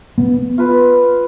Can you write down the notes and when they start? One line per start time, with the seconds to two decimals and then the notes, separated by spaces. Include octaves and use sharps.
0.18 B3
0.58 F4 B4